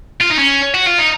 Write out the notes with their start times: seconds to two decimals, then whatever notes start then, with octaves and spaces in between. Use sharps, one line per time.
0.20 F4
0.30 D#4
0.38 C#4
0.74 F#4
0.87 F4
0.98 D#4